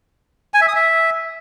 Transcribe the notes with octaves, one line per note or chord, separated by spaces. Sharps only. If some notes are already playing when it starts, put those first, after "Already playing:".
G#5
E5
D#6
E5